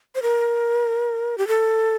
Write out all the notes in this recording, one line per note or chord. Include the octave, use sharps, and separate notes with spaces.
C5
A#4
G4
A4